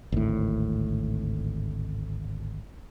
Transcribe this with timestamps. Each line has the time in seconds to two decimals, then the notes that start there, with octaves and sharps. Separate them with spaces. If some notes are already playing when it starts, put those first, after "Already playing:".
0.12 G#1 D2 A2